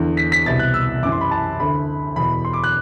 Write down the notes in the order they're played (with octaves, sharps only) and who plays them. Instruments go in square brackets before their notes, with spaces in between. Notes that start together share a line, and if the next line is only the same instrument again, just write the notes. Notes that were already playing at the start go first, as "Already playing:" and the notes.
Already playing: [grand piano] E2 D3
B6
B6
C2 B2 A6
F#6
E6
F#2 E3 D6
C6
B5
A5
D2 D3 B5
E2 B2 B5
C6
D6
F#6